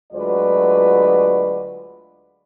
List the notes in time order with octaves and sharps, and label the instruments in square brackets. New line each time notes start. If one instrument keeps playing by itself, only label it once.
[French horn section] D2 F#3 G#3 F4 B4 D5